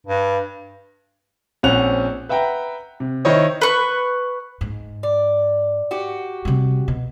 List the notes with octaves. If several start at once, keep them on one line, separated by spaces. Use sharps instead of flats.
G2
A#1 C4 C#4 F#5 F#6 F7
B4 E5 F#5 G5 A#5
C3
D#3 E4 C5 C#5 D#5
B4 C#6
G#2
D5
F#4 G4
C3 G3
B2